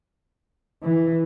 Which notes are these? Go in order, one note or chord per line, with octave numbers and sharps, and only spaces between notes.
E3